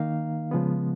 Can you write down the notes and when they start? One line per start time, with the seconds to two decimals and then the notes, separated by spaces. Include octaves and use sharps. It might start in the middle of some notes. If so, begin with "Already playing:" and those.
Already playing: D#3 A#3 D#4 F5
0.51 C#3 F3 G#3 B3